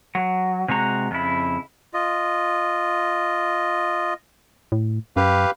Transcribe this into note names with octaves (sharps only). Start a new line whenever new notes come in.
F#3
C3 G#3 F#4 A#5
F2 C#3 E4
F4 D#5
A2
F#2 G4 B4 F5